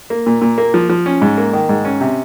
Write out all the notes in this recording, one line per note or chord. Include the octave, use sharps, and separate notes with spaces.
A#3
A#2
A#2
A#3
F3
F3
C#4
G#2
A#3
D#3
G#2
C#4
C3